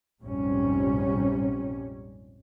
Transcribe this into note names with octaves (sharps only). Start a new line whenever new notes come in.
A#1 F2 G#2 C3 G3 C#4